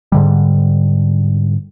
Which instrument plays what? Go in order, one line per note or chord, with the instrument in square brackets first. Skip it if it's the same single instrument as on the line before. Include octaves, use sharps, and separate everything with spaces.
[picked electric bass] G#2 D3 G3